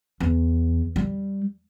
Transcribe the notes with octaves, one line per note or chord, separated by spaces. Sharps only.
E2
G3